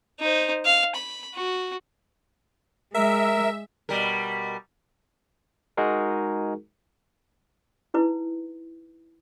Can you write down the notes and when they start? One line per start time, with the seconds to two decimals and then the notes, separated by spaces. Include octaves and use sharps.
0.20 D#4 C5
0.65 F5
0.96 B5
1.34 F#4
2.94 G#3 A#4 E5
3.89 B2 G3 A#4
5.77 G#3 D#4 F#4 G#4 A#4
7.94 D#4 E4 B4